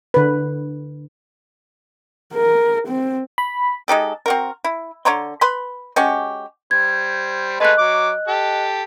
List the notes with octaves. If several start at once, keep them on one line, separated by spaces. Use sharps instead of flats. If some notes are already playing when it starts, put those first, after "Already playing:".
D3 B4
A#4
C4
B5
G#3 D#4 G4 A4
C4 F#4 A#4
E4
D3 C#5 A#5 C6
B4 B5 C6
G#3 C#4 F#4 G4
G3 C5 G#6
G#3 A3 B4 D#5 F#6
F#3 D6
G4 A4